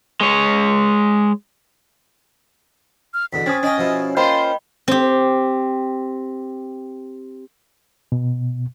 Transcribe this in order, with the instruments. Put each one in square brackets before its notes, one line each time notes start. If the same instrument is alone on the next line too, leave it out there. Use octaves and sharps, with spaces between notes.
[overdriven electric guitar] G#3 C#5
[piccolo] F6
[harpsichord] E2 B2 D3 [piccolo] B6
[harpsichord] C4 [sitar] C#4 [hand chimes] D#6 G#6 A6
[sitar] C#4 [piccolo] D#5 [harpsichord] G5 G#5 A#5
[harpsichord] B2 F3 E4
[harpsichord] A#3 [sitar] F4 C5 [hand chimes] D#5 G5 B5 [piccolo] C6
[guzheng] C4 G4
[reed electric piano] B2